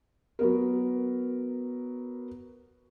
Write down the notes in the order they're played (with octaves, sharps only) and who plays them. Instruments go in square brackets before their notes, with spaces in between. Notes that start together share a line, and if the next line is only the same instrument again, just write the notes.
[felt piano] F#3 B3 A#4